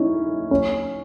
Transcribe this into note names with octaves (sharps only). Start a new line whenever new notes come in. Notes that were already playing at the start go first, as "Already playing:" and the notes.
Already playing: C#4 D#4 E4
C#4